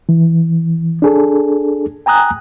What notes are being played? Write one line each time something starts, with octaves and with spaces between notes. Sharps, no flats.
E3
D4 G#4 A4
G5 G#5 A#5 D#6 F#6